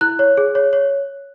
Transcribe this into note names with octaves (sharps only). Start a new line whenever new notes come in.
E4 F#6
C#5
G#4
C#5
C#5